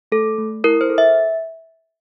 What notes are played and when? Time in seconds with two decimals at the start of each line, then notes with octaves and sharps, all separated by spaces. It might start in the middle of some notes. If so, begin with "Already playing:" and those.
0.12 A3 A4
0.38 A3
0.64 E4 A#4
0.81 C5
0.89 A4
0.98 E5